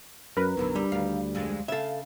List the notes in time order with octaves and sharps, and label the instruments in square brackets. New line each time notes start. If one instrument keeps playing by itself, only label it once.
[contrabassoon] F#2 [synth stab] A#4 B4
[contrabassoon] B1 [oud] F#2 D3 F#3
[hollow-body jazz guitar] G3
[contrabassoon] D2 [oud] D#3 F5
[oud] F2 G#3 D5
[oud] C#3 F5 [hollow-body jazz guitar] A4 E5